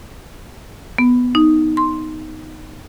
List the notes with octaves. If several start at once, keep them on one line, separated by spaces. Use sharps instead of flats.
B3
D#4
C6